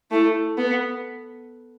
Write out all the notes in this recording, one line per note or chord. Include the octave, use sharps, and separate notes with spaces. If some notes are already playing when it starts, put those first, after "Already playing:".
A3 E4
B3